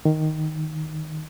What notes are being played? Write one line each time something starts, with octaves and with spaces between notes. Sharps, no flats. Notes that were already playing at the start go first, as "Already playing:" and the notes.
D#3